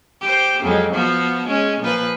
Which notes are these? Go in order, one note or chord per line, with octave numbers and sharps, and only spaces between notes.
G4 C5
F2 F#3 G#3
F3 B3 F#4
G#3 C#4
A#2 F3 B4